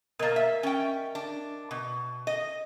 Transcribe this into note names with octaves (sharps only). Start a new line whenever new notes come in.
B2 A#3 A#4 D#5 A6
E5
C#4 G5
D4
B2
D#5